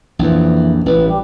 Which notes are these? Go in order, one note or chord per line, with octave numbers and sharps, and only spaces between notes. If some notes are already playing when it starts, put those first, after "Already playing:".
A#1 F2 E3
A1 B4
G3